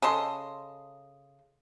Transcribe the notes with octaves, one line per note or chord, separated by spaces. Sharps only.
C#3 A4 D#5 C6